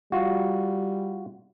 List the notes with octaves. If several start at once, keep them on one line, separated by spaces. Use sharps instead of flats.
G3 F4 F#4